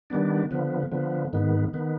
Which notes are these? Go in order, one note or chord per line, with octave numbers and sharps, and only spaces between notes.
D#3 G3 B3 D4
D3 F3 B3
D3 F3 B3
G#2 D#3 B3
D#3 B3